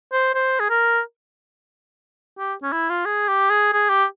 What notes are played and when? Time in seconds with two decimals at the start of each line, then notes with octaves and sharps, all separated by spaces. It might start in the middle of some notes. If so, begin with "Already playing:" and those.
0.12 C5
0.35 C5
0.60 G#4
0.70 A#4
2.38 G4
2.63 C#4
2.72 E4
2.89 F4
3.06 G#4
3.28 G4
3.50 G#4
3.73 G#4
3.90 G4